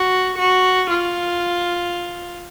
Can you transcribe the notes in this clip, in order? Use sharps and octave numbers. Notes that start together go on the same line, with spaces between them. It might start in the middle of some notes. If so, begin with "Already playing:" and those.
Already playing: F#4
F#4
F4